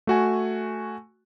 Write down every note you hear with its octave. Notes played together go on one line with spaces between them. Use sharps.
A3 F#4 G#5